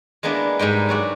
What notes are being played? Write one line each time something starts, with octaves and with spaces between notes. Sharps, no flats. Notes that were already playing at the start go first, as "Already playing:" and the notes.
G#3 A#3 B3 D4 E4
G#2 G3 G#3 G5
F#3 F#4 D5